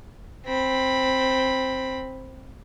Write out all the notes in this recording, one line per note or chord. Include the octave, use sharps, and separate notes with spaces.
C4 B5